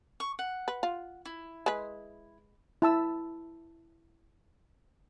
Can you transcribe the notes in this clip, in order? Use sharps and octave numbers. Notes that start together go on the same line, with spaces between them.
C#6
F#5
B4
F4
E4
G#3 B4
E4 A5 E6